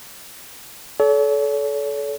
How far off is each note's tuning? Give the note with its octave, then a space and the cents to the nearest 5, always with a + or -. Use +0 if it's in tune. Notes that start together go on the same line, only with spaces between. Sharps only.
A4 -30 C#5 +45